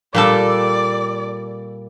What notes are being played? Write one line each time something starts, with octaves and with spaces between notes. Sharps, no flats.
A#2 G3 A4 D5